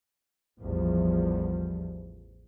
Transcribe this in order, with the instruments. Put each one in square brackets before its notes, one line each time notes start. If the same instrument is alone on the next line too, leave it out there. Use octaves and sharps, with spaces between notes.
[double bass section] A1 E2 F3 G3